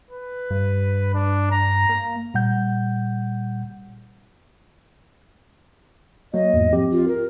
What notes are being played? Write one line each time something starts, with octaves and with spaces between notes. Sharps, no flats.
B4
G2
D4
A#5
A#3
A#2 G3 F#5 G6
F#3 A#3 D#5
E2 G#2
F3 C4 G4
F4
A#4